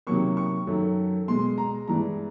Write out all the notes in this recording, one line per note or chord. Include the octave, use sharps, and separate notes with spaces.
C3 D#3 F#3 A#3 C#6
C#6
F#2 D#3 F#3 A3
B2 G#3 C6
A#5
G2 E3 G#3 A#5